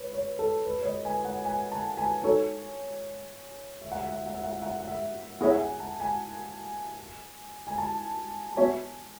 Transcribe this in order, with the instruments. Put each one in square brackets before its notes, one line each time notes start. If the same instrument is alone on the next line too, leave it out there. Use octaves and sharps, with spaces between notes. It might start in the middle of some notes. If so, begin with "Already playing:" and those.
Already playing: [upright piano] B4 C#5
C#5
A4
B4
C#5
D#5
G#5
F#5
G#5
A5
G#5
[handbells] D#4 F#4 A4 [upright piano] C#5
[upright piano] E5
F#5
E5
F#5
E5
F#5
E5
F#5
E5
F#5
E5
F#5
E5
[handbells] B3 E4 G#4 C#5 E5 [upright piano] F#5
[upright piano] F#5
G#5
A5
G#5
G#5
A5
A5
[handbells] B3 F#4 C#5 E5 [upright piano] G#5